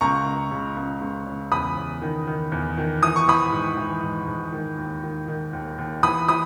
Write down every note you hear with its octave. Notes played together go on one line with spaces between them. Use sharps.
C#2 A#5 C#6
C#2
C#3
C#2
C#2
C#3
E2 B5 D#6
E2
D#3
D#3
E2
D#3
E3 D#6
C#6
E3 B5 D#6
G#2
E3
G#2
G#2
D#3
D#2
D#3
D#3
D#2
D#2
E3 B5 D#6
E3 B5 D#6